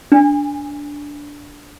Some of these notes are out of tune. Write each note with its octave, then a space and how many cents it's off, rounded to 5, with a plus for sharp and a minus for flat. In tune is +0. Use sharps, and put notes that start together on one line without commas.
D4 -10 G#5 -10